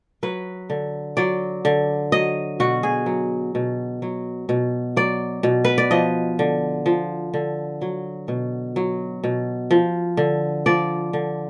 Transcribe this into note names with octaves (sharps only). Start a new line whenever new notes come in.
F#3 B4
D3
F#3 D5
D3
F#3 D#5
B2 F#4
G#4
F#3
B2
F#3
B2
F#3 D5
B2
B4
D5
F3 D#5
D3
F3
D3
F#3
B2
F#3
B2
F3
D3
F3 D5
D3